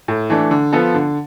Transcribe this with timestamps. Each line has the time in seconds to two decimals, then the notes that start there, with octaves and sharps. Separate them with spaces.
0.08 A2
0.30 E3 A3 D4
0.51 D3
0.73 F3 B3 F4 A4
0.94 D3